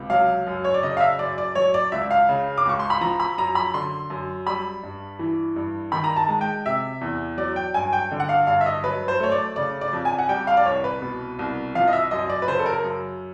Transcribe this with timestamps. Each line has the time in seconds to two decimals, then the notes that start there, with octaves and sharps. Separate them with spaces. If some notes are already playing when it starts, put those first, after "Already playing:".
Already playing: C#2 C3
0.10 F#3 F5
0.47 F#2
0.64 C#5
0.74 D5
0.83 C#3 D#5
0.97 F5
1.00 E5
1.19 F#2 D5
1.38 D5
1.55 F#3 C#5
1.74 D5
1.92 C#2 E5
2.11 F5
2.29 C#3
2.58 D6
2.65 C#2 C#6
2.79 C6
2.90 B5
3.01 F3 A#5
3.20 B5
3.38 F#2 A#5
3.55 B5
3.74 D3 C6
4.10 F#2
4.47 G3 B5
4.83 G2
5.19 E3
5.56 G2
5.92 D#3 B5
6.04 A#5
6.16 A5
6.28 G#3
6.41 G5
6.66 C3 E5
7.01 E2
7.38 F#3 D5
7.56 G5
7.74 G2 G#5
7.93 G5
8.11 D3
8.20 F#5
8.29 F5
8.47 G2 F5
8.61 E5
8.66 D#5
8.84 F#3 B4
9.08 C5
9.20 A3 C#5
9.32 D5
9.56 C#3 D5
9.81 D5
9.93 F2
10.05 G#5
10.19 F#5
10.29 G3 G5
10.47 F5
10.57 D5
10.66 C2 C#5
10.84 B4
11.02 B2
11.39 C2
11.75 F3 F5
11.88 D#5
11.93 E5
12.11 F#2 D#5
12.30 D5
12.42 B4
12.48 C#3 C5
12.59 A4
12.66 A#4
12.84 F#2